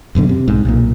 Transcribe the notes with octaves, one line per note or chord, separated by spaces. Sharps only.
D#1 F#2 B2 D3
C3
B1 G#2
B1 A#2